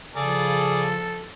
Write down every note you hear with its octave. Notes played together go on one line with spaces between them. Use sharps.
C#3 F3 G#4 A4 D5